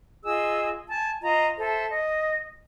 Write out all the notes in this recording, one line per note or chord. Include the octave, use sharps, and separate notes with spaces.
F4 G#4 D#5 E6
G#5 A5
F4 D#5 A#5
A4 C5 E5
D#5